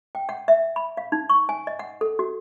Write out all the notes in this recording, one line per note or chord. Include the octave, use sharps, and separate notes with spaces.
G5
F#5
E5
B5
F5
D#4
C#6
G#5
D#5
F#5
A4
F#4